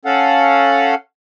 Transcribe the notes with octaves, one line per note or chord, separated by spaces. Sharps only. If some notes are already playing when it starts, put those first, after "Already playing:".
C#4 A4 F5 F#5